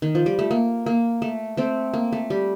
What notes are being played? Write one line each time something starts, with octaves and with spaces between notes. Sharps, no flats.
D#3
F3
G3
A3
A#3
A#3
A3
A3 C4
A#3
A3
G3